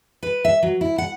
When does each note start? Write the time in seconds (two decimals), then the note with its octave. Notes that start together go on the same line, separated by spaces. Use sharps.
0.23 B4
0.45 E5
0.63 F#3
0.81 E4
0.98 F#5